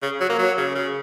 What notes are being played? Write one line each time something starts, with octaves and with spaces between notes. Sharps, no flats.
C#3
F#3
A#3
F#3
C#3
C#3